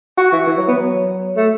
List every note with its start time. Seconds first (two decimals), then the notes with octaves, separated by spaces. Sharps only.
0.18 F#4
0.32 E3
0.47 E3
0.57 F#3
0.68 B3
0.77 F#3
1.36 A3